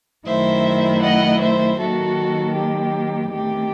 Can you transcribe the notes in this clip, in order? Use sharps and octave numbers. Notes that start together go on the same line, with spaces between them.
F#2 D#3 A3 E4 C5 E5
D#5 F#5
C5 E5
D#2 D#3 F#3 F#4 A4
G4
E2 D#3 A3 C4 G4